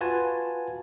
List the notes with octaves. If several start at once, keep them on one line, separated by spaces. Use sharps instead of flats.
F4 F#4 B4 G#5 A5